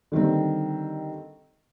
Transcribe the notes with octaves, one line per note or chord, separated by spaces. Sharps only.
D3 D#3 G3 C4